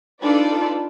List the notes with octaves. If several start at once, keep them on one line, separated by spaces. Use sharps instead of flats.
D4 D#4 F4 A4 B4 D5